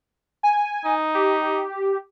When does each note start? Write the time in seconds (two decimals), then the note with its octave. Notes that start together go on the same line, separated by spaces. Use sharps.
0.43 G#5
0.85 D#4
1.14 G4